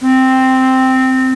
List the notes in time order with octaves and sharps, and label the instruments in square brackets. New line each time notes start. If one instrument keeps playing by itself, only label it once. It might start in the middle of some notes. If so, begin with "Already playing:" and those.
[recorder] C4